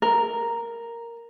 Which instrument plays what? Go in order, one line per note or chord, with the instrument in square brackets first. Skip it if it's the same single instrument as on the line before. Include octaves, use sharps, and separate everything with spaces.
[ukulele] A#4